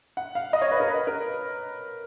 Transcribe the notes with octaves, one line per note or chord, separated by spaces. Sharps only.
F#5
F5
D#5
C#5
B4
A#4
B4
A#4